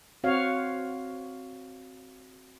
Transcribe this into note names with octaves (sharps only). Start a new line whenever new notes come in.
C4 F#4 C#5 F5